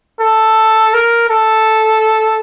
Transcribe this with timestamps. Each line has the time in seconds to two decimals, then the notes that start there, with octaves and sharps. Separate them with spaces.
0.20 A4
0.94 A#4
1.30 A4